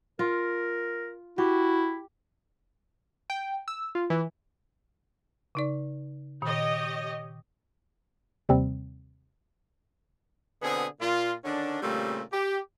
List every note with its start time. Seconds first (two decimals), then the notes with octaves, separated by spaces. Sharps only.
0.19 F4 A#4
1.38 E4 F#4 G4
3.30 G5
3.68 E6
3.95 F4
4.10 E3
5.55 C#3 D#4 D5
6.42 A#2 D#3 G4 C#5 D#5
8.49 D#2 C3 G3 C4
10.63 B2 D3 B3 C4 G#4
11.00 A#2 F4
11.45 D3 D#3 C#4 D4
11.82 A#2 C#3 G3 A3 C4
12.33 G4